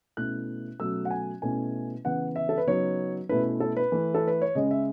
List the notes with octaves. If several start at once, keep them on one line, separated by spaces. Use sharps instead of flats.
B2 A3 C#4 E4 F#6
B2 F#3 A3 C#4 E6
F#5
G#5
B2 A3 C#4 E4 G#5
C#3 E3 B3 F#5
E5
A4
B4
C#3 F#3 B3 D#4 C#5
B2 A3 C#4 E4 B4
A4
B4
E3 A3 E4
A4
B4
C#5
C#3 G#3 C#4 D#5
E5